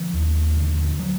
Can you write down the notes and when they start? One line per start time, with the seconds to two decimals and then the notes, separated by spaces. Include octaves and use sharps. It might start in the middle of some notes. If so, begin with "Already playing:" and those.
Already playing: D3 F3
0.14 D#2
0.56 D3
0.99 F#3